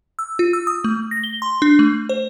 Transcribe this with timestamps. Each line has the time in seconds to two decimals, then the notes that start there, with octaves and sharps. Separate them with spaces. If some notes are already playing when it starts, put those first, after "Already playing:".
0.19 E6
0.39 F4
0.53 E6
0.67 D#6
0.84 A3
1.11 A#6
1.24 G7
1.42 C6
1.62 D4
1.79 A3
2.09 C5